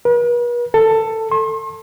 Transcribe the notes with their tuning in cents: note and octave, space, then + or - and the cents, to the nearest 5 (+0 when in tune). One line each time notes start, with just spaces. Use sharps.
B4 -45
A4 +15
C6 +40